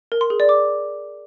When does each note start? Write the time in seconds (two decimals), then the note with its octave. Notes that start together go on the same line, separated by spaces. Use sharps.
0.12 A#4
0.21 C6
0.30 G#4
0.40 D5
0.49 D6